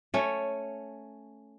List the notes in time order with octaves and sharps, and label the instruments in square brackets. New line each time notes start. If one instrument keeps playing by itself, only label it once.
[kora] A3 C#4